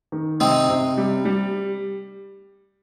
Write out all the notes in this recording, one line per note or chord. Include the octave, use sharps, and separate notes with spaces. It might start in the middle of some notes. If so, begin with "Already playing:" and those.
D#3
C3 C4 D#4
C3
G3
G3